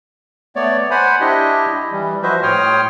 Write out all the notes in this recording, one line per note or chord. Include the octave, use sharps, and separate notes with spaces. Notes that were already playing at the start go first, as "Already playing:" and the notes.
A3 B3 C#5 D5
C5 F#5 G#5 B5
D4 E4 G4 D#5
E3 G3
F3 F#4 B4 C5 D#5 E5
A2 C#5 G5 C6 D#6 F6